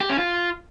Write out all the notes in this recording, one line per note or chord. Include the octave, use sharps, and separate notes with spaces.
G4
C#4
F4